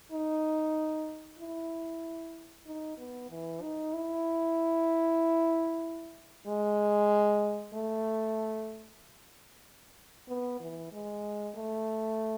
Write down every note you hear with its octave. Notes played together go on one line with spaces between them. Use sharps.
D#4
E4
D#4
B3
E3
D#4
E4
G#3
A3
B3
E3
G#3
A3